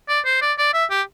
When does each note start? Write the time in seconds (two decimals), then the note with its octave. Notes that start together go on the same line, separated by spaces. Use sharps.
0.09 D5
0.25 C5
0.41 D5
0.58 D5
0.74 E5
0.90 G4